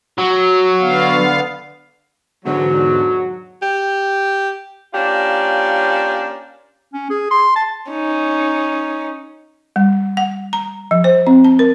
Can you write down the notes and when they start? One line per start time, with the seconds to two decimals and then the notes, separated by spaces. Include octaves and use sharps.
0.18 F#3
0.80 D3 B3 F5
2.45 E2 G#2 D3 F#3
3.62 G4
4.93 A#3 C#4 D4 F4 G4
6.93 C#4
7.10 G#4
7.31 C6
7.56 A5
7.90 C#4 D#4
9.76 G3
10.17 F#5
10.53 A#5
10.91 F3
11.04 C5
11.27 C4
11.44 A5
11.59 A#4